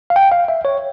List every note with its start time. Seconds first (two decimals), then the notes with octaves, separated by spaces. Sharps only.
0.10 F5
0.16 G5
0.32 F5
0.48 E5
0.65 C#5